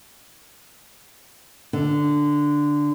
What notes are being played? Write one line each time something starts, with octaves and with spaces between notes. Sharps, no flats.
D3